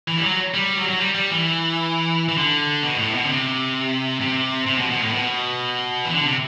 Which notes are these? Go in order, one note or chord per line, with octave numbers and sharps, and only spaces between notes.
E3
G3
F#3
G3
F#3
F#3
G3
G3
E3
E3
D3
B2
A2
B2
D3
C3
C3
C3
B2
B2
A2
B2
E3
D3
C3